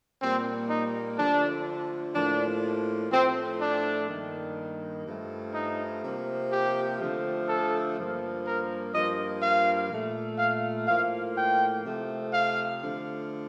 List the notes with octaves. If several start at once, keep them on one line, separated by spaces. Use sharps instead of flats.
A#2 G3 A#3 C4
D#4
D3 F3 A3 D4
A2 F3 A#3 D4
A2 F3 A3 C4
D4
G2 D#3 A#3
G2 F3 A3
D#4
C3 F3 A#3
G4
D3 F3 A3
A4
G2 F3 A#3
A#4
G2 F3 A#3 D#5
F5
A#2 A3
F5
A2 F3 A#3 F5
G5
C3 F3 A3
F5
D3 F3 A3